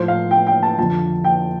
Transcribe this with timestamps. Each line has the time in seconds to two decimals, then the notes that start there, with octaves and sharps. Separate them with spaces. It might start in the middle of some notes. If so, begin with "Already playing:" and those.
Already playing: A2 F3 C5
0.08 F5
0.31 G5
0.47 G5
0.63 A5
0.78 F2 D3 F3 A5
1.24 G5